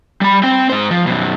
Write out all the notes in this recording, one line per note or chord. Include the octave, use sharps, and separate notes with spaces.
G3 B5
C4 G5
G#2 C5
F3
F#2 B2